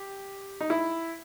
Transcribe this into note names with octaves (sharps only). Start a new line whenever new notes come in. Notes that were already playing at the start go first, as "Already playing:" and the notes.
Already playing: G4
D#4
E4